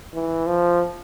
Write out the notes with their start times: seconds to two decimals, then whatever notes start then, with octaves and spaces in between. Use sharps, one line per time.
0.14 E3
0.47 F3